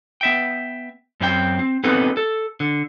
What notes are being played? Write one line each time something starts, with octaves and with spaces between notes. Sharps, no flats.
B3 E5 G5
F#2 C4 D4 G5
C4
B3 C4 D#4 G#4 A4 B4
A4
D3